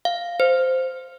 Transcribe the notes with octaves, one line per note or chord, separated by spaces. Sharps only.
F5
C5